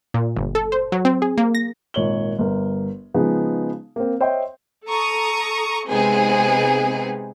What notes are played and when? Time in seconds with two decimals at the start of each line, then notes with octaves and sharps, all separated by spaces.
0.14 A#2
0.37 G1
0.55 A4
0.72 C5
0.92 F#3
1.05 C4
1.22 G#4
1.38 A#3
1.55 A#6
1.94 G#1 A#2 C#5 F#7 G7
2.39 G1 A#4
3.14 C#3 F3 G#3 B3 D#4
3.96 A#3 C4
4.21 C5 C#5 D#5 E5 G5 C6
4.88 A4 A#5 C#6 D#6
5.88 C3 G#3 B3 C4 D#4 G#4